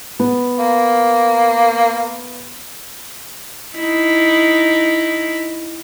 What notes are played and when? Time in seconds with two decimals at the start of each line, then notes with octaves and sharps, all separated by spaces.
0.20 B3
0.59 A#3
3.76 D#4 E4